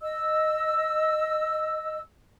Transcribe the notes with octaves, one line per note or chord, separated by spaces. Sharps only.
D#5 E6